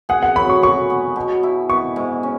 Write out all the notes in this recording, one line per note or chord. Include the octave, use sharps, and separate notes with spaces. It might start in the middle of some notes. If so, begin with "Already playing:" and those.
G#4 F#5
F#5
F#3 B5
C#6
F#4 C#6
B3
B2
E4
B3 C#6
G#2
C#4